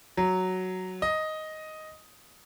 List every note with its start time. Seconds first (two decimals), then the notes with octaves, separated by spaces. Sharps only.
0.17 F#3
1.02 D#5